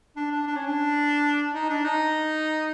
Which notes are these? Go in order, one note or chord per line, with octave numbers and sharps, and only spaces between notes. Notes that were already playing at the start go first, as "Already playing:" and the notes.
D4
D4
D4
C#4
D4
D#4
D4
D#4